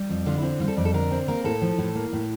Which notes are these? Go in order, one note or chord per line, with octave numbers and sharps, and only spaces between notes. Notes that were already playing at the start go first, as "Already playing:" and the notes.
Already playing: G3
F2
D3 F4
E4
C4
G3 F4
A4
F2 D5
A4
D3 A#4
C4
A#3 A#4
A2 A4
F3
A2
A#3
A2